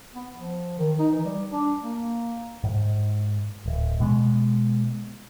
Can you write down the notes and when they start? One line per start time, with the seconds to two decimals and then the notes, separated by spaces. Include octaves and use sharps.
0.15 B3
0.37 F3
0.78 D#3
0.99 D#4
1.13 E3
1.25 G3
1.52 D4
1.82 A#3
2.64 G#2
3.66 D1
4.00 B2 G#3 B3